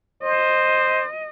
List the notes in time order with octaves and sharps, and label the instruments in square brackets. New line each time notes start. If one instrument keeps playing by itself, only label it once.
[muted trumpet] C5 [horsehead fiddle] D#5